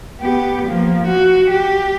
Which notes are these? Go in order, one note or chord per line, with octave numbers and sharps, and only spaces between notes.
B3 G4
F3 A#3
F#4
G4